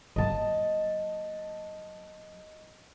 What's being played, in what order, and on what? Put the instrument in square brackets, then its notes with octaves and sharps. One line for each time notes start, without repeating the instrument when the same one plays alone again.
[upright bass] F#3 A#3 [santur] D#5 A5 D#6